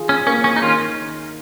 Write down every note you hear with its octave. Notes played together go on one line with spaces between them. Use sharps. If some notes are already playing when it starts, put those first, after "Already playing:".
Already playing: D#3 F4 G#4
C#4
A#3 C#4
C#4
D#4
D#3 C#4 F4